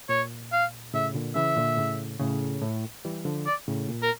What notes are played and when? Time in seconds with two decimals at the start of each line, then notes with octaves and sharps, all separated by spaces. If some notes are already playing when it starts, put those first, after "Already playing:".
0.09 A#2 C#5
0.52 F5
0.94 A2 C#3 E5
1.14 A#2 D3
1.35 C#3 E3 E5
1.56 A#2 D3
1.78 A2 C#3
2.19 A2 C#3
2.62 A2
3.05 E3 G3
3.25 D3 F3
3.46 D5
3.68 A2 C#3
3.88 A#2
4.02 A#4